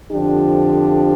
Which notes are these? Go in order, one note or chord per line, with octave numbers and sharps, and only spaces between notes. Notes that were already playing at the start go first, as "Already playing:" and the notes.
F2 D3 F3 D4 G4